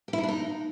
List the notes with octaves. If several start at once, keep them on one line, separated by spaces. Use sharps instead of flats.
G4
E4
D#4
D4
D#4